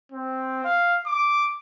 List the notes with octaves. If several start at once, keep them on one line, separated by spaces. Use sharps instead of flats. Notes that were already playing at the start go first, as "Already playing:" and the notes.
C4
F5
D6